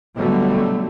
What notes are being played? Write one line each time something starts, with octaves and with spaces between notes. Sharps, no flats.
B2 D3 F#3 G3 A3